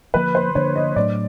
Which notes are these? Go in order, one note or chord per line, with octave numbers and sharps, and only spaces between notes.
D3 F3 A#3 B4
C5
D3 F3 A#3 D4 C#5
D#5
A2 F#3 A3 D4 D5